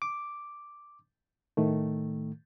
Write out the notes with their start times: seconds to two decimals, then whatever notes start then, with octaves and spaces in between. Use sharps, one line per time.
0.02 D6
1.57 A2 D#3 A3